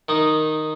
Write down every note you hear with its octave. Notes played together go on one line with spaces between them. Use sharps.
D#3 D#4